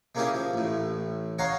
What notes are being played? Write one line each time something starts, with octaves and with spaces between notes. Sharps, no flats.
G#3 A#3 C#4 E4 G4 G#4
F3
A1 A2
C#5 D#5 F5 F#5 A#5 C6